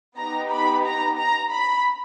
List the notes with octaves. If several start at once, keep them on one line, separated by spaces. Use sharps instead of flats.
B3 D#4 G4 A#5
B5
A#5
A#5
B5